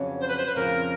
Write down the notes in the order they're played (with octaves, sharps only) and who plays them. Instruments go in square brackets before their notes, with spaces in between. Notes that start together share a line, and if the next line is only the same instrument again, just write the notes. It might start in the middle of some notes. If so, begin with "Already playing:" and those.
Already playing: [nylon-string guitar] F2 C#3 F#3 B3 D4
[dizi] C5
B4
C5
B4
[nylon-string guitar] F2 C#3 F3 [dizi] A#4